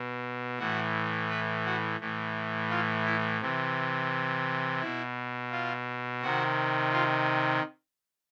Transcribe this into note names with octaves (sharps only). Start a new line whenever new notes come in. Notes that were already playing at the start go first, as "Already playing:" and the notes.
Already playing: B2
A2 E3 F#4
B4
F#4
A2 E3
F4
E4
C3 E3
B2 E4
F4
C3 D#3 F#4
F4